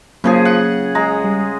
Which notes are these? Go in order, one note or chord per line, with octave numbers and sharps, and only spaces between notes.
C#3 F3 F#3 A#3 G#4
F#5
G#3 A#5
G3